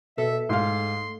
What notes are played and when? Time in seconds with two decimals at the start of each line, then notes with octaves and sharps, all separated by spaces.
0.18 B2 A4 E5
0.49 G#2 A3 F5 C6